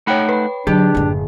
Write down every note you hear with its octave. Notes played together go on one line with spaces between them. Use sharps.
A3 D#4 C#5 F#5 G5 B5
B4 B5
D3 F#3 D4 G4 G#4
F#1 A2